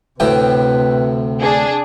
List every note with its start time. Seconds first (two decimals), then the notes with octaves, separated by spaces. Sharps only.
0.20 D2 A2 C3 B4 G5
1.41 D4 G#4